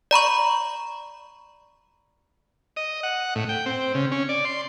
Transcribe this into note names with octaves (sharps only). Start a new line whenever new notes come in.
D5 A#5 B5 C#6
D#5
F#5
A2
G5
C4
C#3
C#4
D5
C6